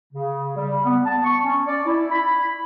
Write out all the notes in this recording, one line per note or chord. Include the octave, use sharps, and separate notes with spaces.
C#3
G3
B3
A5
C#6
C#4
D5
E4
B5